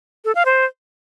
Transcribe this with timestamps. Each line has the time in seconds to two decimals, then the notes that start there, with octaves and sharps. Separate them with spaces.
0.25 A4
0.35 F5
0.45 C5